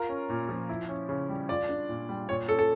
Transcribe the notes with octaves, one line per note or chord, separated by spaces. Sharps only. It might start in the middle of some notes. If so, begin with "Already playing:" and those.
Already playing: F4 A#4
C#4
A#2
F3
E4
C#4
C#3
G3
F4 D5
D4
A#2
G3
A#2 C#5
C#4 A4
A4